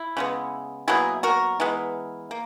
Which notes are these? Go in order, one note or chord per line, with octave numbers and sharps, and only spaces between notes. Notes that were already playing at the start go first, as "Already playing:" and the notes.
Already playing: E4
C#3 G#3 B3
B2 F#3 A#3 E4 G#4
F#4 A#4
E3 G#3 B3
A#3